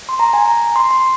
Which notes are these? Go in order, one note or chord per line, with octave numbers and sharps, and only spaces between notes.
C6
A#5
G#5
A#5
C6
C6